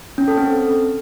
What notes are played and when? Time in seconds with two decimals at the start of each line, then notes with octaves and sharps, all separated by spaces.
0.18 C#4
0.28 A4
0.38 C4